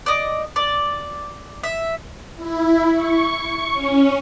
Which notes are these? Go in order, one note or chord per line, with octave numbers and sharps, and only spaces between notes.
D5 D#5
D5
E5
E4
C#6
C#4